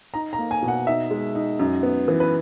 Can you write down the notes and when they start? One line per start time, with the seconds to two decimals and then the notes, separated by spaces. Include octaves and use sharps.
0.14 D#4 A#5
0.33 A#5
0.39 A#3
0.51 G#5
0.62 B2
0.68 F#5
0.87 D#4 E5
1.11 G#3
1.35 D#4
1.59 F#2
1.83 B3
2.08 E3
2.20 B4